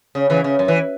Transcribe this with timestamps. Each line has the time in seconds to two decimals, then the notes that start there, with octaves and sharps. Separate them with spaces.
0.15 C#3
0.30 C#3 E3
0.44 C#3
0.59 F#2
0.68 E3